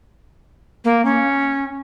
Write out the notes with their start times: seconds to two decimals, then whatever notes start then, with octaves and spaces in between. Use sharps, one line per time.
0.84 A#3
1.05 C#4